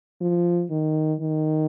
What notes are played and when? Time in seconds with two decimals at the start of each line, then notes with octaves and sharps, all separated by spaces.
0.21 F3
0.70 D#3
1.20 D#3